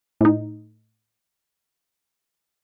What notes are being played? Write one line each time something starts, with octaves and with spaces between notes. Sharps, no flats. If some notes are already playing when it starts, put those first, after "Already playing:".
A2 D#4